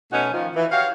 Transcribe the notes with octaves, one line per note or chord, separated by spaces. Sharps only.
B2 A3 B3 C#4 D#4 F#4
D#3 F3
E3
F#4 G4 C#5 F5